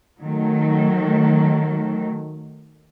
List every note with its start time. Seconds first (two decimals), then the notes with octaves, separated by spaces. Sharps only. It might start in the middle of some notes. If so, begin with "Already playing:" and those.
0.21 D#3 F#3 A3